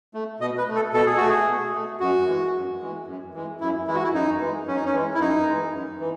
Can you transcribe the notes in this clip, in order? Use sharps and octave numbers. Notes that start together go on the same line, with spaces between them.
A3
B2 D#5
B4
A3
A4
B2 A4
G#4
A3 F#4
G#4
B2
A3
F#2 F#4
E3 G#3
F#2
E3 G#3
F#2
E3 G#3
F#2 E4
E3 G#3 E4
F#4
E4
F#2 D#4
E3 G#3
F#2 C#4
D#4
C#4
E3 G#3
E4
F#2 D#4
E3 G#3
F#2
E3